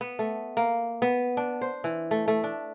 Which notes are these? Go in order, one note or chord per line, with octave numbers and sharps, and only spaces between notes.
B3
A3
A#3
B3
D4
C5
E3
A3
A3
D4